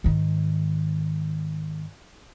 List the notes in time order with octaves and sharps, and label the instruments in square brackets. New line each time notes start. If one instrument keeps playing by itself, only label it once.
[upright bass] G#2 D#3